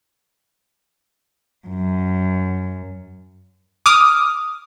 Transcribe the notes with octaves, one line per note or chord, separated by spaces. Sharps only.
F#2
D6 D#6 F6